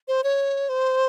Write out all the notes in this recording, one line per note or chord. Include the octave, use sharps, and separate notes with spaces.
C5
C#5
C5